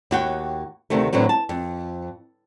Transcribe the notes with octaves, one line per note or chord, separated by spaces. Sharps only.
D#2 F#4 G5
D2 C3 D#3 A3
A2 D3 E3 F#3 C4
A5
F2